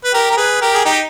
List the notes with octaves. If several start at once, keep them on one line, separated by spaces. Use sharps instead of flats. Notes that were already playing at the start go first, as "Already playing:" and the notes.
B4
G4 A#4
A#4
G#4 B4
G4 A#4
G#4
D#4 G4